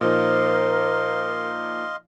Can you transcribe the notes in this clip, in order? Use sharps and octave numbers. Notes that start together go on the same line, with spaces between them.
A#2 F3 D#4 A#4 C5 D#5 F5 C6